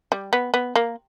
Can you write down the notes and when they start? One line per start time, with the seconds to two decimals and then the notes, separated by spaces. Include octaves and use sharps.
0.12 G3
0.33 B3
0.54 B3
0.76 A#3